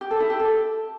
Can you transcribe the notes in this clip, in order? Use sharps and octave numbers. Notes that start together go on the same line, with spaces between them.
G4
A4
E4
G4
A4